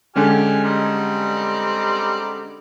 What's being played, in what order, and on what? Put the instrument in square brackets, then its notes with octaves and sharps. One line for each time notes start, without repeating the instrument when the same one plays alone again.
[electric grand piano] D3 G#3 C#4 [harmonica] G4 G#5 F6
[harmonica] G3 C4 D#4